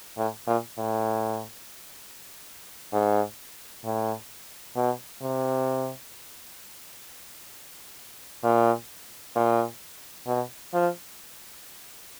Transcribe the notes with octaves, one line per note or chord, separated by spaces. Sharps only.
A2
A#2
A2
G#2
A2
B2
C3
A#2
A#2
B2
F3